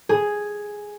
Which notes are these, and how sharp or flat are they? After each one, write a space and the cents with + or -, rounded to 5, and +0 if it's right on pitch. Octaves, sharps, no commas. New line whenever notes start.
G#4 +0